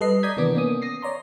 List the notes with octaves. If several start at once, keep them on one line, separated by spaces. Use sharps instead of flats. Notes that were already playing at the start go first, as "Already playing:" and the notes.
G3 A4 B4 D#5 C7
D5 A#5 D#6 G6 G#6 B6
C3 D#3 E3 B3 D4 D6
A#3 B3 C#4 D#6
D#6 A#6 C7
C#5 D5 A#5 C6